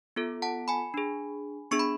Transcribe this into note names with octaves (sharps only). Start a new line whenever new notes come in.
B3 F4 A4
F#5 A5
G#5 B5
D4 G#4
B3 D4 G#4 C#6
B5